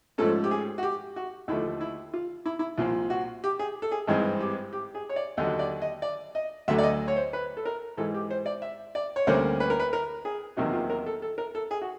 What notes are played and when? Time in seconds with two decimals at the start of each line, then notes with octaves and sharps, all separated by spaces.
0.18 G#2 F3 A3 C#4 A4
0.44 G4
0.51 G#4
0.78 F#4
0.83 G4
1.16 F#4
1.48 D#2 D3 F3 A3 E4
1.81 E4
2.14 F4
2.46 E4
2.59 E4
2.78 C2 A#2 F3 F4
3.10 F#4
3.44 G4
3.59 G#4
3.82 A4
3.92 G#4
4.07 G#1 G2 E3 G#3 C4
4.41 G4
4.73 G4
4.95 G#4
5.09 C#5
5.16 D5
5.37 D#2 D3 F#3 D#5
5.59 D5
5.82 D#5
6.02 D5
6.35 D#5
6.68 D2 D3 F#3 A3 E5
6.78 D5
6.83 D#5
7.08 C#5
7.16 C5
7.33 B4
7.57 A4
7.66 A#4
7.97 G#2 E3 G#3 A4
8.14 G4
8.31 C5
8.46 D5
8.62 E5
8.95 D5
9.16 C#5
9.27 D2 D3 G3 A#3 C#4 C5
9.60 B4
9.70 A#4
9.80 B4
9.93 A#4
10.25 G#4
10.57 E2 C3 D#3 F#3 A#3 F#4
10.73 F4
10.90 A#4
11.06 A4
11.22 A4
11.38 A#4
11.55 A4
11.71 G#4
11.81 F#4